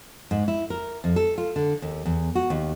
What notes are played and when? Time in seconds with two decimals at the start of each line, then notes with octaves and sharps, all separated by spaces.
0.31 G#2
0.48 E4
0.70 A#4
1.04 F2
1.16 A4
1.38 F4
1.56 D3
1.82 D#2
2.05 E2
2.35 F#4
2.50 D#2